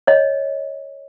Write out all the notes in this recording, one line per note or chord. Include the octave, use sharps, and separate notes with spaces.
C#5 D#5